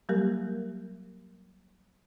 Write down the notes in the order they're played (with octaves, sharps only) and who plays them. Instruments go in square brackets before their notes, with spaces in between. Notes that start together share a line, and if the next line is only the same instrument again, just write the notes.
[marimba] F#3 G3 A#3 G4 A#4